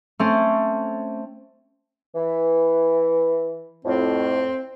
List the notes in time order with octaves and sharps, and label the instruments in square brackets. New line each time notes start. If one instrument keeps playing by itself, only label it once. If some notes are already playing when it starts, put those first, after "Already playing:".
[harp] A3 C4 C#4
[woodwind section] E3
[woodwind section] F2 A2 [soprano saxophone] C4